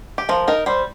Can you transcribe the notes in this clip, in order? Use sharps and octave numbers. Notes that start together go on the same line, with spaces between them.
G4
F3 A#4
D#4 A#4
G3 C5